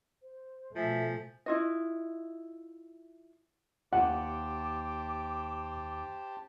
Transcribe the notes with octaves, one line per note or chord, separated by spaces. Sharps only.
C5
B2 F3 A3 E5 G#5
E4 F4 D#5
D#2 G4 C5 F#5 A5 D6